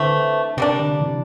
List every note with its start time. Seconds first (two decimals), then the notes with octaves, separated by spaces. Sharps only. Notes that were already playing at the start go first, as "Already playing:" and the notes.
Already playing: D3 E3 A3 C4
0.57 C3 G3 A#3 D4
0.79 D3
1.00 C3 E3